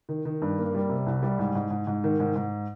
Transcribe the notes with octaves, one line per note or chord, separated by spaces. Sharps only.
D#3
D#3
G2
A#3
G3
C3
C2
G3
G#2
G#2
G#2
G#2
D#3
G#2
G#2